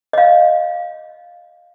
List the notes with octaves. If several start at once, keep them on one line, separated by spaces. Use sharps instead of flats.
D#5 F5